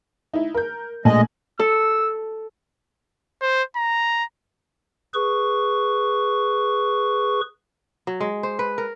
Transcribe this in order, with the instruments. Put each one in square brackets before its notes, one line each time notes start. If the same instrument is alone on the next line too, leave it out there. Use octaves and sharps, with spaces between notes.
[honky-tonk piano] D#4 E4
A#4 G6
[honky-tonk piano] A#1 G#5 F#7 [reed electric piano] A#2 A3 [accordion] G#3 D#5
[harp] A4 [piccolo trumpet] E6
[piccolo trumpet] C5
A#5
[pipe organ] G#4 B4 C#6
[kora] F#3
G#3
C5
B4
A#4